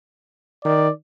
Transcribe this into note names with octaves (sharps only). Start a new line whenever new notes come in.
D#3 D5